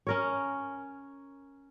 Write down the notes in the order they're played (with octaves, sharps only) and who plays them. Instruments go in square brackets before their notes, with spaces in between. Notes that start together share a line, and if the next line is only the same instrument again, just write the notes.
[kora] C#4 A#4 C#5